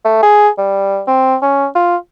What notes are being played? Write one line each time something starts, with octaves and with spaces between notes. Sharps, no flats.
A3
G#4
G3
C4
C#4
F4